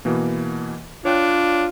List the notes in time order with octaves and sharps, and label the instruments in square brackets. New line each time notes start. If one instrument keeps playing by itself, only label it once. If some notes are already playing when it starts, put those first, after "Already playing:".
[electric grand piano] B2 E3 A#3
[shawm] D4 [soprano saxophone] F4 [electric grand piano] C#5 G5 F#6